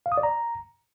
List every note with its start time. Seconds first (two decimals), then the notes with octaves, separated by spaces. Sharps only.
0.06 F5
0.12 D#6
0.18 D5
0.23 A#5